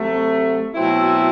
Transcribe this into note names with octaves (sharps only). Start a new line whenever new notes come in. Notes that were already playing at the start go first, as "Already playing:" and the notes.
Already playing: C3 F#3 A3
B2 F#3 A3 C4 E4